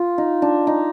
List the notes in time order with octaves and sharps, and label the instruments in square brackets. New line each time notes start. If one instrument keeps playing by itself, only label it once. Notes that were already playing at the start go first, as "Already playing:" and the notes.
Already playing: [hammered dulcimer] F4
D#4
D4
D#4